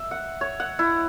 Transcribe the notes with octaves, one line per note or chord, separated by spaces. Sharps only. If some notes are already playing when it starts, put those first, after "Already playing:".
Already playing: E5
F#5
C#5
F#5
E4